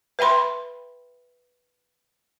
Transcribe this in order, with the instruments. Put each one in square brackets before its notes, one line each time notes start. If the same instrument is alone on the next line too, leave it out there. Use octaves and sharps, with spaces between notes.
[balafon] B4 E5 G5 B5 C6